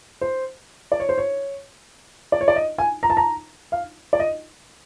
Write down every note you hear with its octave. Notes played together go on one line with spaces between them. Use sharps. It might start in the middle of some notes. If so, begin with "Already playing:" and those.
C5
D5
C#5
C5
C#5
D5
C#5
D5
D#5
G#5
A#5
A5
A#5
F5
D5
D#5